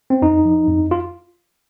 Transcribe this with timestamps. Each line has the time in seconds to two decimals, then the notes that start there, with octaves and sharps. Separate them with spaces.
0.10 C4
0.22 F2 D#4
0.45 F3
0.68 F2
0.91 F4